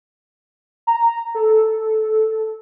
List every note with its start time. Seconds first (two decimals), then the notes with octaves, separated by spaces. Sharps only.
0.87 A#5
1.35 A4